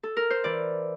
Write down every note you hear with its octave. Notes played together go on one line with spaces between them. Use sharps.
A4
A#4
C5
E3 D5